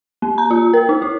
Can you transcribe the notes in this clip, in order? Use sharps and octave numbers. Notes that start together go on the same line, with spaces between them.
A#3
A#5
F4
A#4
D#4
E4